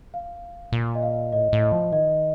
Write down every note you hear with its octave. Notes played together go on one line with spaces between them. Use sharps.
F5
A#2
D#5
F5
A2 D#5
A2
D#5
F3
D#3 D#5